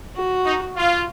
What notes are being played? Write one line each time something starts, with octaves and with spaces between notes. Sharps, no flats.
F#4
D#4
F4